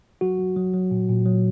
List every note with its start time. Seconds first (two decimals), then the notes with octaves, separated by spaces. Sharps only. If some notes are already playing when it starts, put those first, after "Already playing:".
0.21 F#3 F#4
0.39 F#3
0.56 F#3
0.74 F#3
0.91 A#2
1.09 A#2
1.26 F#3